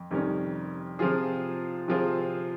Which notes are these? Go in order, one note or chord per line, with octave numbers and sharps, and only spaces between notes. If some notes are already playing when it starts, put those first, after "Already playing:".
Already playing: F2
F2 C3 D#3 G3 C#4
C3 F3 C4 F4 G#4
C3 F3 C4 F4 G#4